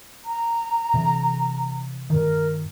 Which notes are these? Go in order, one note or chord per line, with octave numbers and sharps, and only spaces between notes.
A#5
C3 E3
G2 D#3 A#4